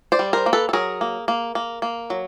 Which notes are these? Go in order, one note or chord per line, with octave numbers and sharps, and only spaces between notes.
C5 D5
G3
A#4 C5
A#3
A4 B4
A4
F#3 G#4 A#4
A#3
A#3
A#3
A#3
F#3